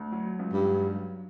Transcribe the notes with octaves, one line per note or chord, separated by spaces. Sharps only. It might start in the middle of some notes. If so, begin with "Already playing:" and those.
Already playing: D2
F#3
C#2
G2
F#3